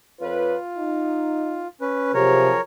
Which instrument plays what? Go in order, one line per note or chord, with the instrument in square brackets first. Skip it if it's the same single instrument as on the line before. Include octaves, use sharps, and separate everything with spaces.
[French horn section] F2 B4 C#5 [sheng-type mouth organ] F4
[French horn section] D#4
[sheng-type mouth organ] C#4 B4
[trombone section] C3 [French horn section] F3 F#3 G#4 [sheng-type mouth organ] A#4 C#5